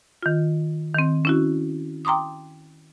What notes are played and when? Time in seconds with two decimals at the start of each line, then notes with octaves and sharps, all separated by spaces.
0.22 D#3 F4
0.95 D#3 C4
1.25 C#4 E4 F#4
2.05 G5 A#5 C6 D6 D#6